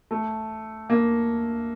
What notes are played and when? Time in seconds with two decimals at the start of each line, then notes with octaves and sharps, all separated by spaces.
0.11 A3
0.90 A#3